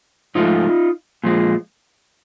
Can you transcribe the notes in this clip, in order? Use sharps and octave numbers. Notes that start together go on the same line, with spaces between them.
G#2 F3 A3 D#4 F4
A#2 F3 G#3